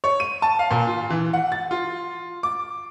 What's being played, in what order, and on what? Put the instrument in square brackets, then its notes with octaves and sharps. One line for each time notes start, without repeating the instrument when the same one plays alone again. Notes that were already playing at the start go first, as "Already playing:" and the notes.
[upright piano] C#5
D#7
A5
F5
A#2
F4
E3
F#5
A6
F4
D6